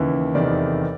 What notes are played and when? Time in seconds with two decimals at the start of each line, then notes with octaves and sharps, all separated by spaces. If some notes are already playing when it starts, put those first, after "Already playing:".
Already playing: D#2 C#3 E3
0.35 F1 E2 C3 D#3 D5